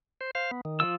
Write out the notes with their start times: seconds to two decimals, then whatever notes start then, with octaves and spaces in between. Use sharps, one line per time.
0.21 C5
0.35 C5 F5
0.51 B3
0.65 D#3
0.80 F3 F4 E6